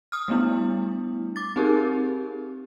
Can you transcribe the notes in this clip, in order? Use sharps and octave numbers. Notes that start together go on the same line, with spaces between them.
D#6 F6
G3 A3 B3 D4 E4
D6 A6
C4 D#4 G4 G#4 A#4